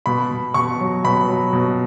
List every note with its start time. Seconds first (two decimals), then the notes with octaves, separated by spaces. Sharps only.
0.06 B2 B5
0.31 B2
0.54 B2 C#6
0.80 F#3
1.04 B2 B5
1.28 F#3
1.53 B2